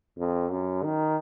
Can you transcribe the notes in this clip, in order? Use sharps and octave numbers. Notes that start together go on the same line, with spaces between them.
F2
F#2
D#3